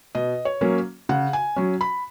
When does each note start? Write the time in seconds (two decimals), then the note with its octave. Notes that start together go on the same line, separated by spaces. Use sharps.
0.15 B2 D#5
0.45 C#5
0.61 F#3 A#3 C#4
1.09 C#3 F#5
1.33 G#5
1.56 F#3 C#4
1.81 B5